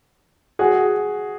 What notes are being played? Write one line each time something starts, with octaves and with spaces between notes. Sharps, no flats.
F#4 G#4